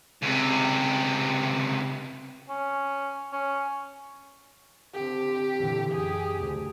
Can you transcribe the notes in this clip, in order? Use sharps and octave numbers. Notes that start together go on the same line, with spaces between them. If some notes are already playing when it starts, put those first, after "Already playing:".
C#2 C3
C#4
C#4
D3 C4 G4
A#2 D3 E3
F#2 G4 G#4
D2